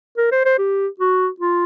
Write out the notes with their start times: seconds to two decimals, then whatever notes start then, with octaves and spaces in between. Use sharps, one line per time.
0.17 A#4
0.32 C5
0.45 C5
0.58 G4
1.00 F#4
1.40 F4